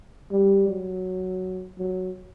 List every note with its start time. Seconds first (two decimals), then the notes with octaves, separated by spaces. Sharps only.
0.31 G3
0.68 F#3
1.78 F#3